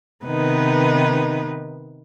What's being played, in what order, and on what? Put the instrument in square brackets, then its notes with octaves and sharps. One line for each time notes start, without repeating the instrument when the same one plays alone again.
[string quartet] C3 D#3 B3 D#4 B4